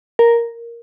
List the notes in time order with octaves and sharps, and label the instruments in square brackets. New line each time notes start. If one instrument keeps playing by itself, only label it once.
[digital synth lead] A#4